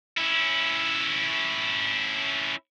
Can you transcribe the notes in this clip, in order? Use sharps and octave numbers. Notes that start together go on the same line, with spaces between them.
C#4 E4